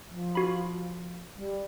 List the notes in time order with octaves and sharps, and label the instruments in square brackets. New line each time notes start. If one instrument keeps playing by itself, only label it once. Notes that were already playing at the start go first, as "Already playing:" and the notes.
[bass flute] F3
[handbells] F#4 B5
[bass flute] G3